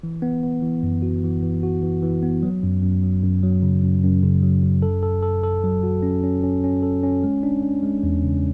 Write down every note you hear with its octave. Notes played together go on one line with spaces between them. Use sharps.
E3
B3
B3
E3
F#2
F#4
E3
E3
F#4
E3
E3
B3
F#3
F#2
F#2
F#3
F#2
F#3
C#3
F#2
F#2
C#3
F#3
F#2
A4
A4
A4
A4
F#3
F#4
C#4
C#4
C#4
C#4
A4
C#4
G#3
D4
D4
G#3
E2
C#3